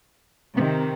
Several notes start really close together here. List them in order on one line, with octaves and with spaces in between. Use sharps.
C3 B3 D#3